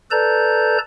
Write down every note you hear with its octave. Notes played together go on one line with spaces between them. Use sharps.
A4 B4 D5 A5 A#5 G6